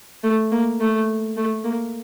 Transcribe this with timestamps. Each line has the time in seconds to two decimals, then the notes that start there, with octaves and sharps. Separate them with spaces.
0.23 A3
0.52 A#3
0.80 A3
1.37 A3
1.64 A#3